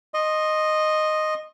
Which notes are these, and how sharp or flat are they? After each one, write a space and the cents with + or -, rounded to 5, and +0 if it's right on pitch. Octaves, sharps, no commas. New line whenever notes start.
D#5 -5 C6 +30